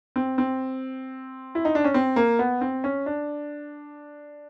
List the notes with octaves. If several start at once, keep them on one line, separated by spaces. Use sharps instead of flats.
C4
C4
E4
D#4
D4
C#4
C4
A#3
B3
C4
C#4
D4